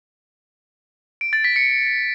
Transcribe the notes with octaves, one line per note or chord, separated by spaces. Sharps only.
D7
A6
B6
C#7